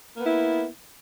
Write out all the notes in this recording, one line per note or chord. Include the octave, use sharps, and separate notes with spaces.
A#3 B3 E4